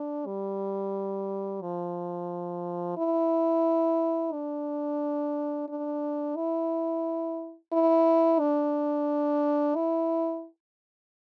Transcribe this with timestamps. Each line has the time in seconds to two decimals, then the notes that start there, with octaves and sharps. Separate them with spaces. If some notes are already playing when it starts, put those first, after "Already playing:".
Already playing: D4
0.26 G3
1.62 F3
2.97 E4
4.33 D4
5.69 D4
6.36 E4
7.73 E4
8.40 D4
9.76 E4